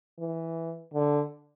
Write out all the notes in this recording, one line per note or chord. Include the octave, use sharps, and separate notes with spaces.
E3
D3